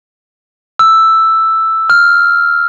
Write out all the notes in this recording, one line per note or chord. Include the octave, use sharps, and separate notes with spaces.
E6
F6